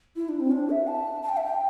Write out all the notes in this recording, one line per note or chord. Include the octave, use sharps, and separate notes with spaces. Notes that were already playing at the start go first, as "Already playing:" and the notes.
E4
D4
C4
D4
E5
A5
A5
G5
E5
G5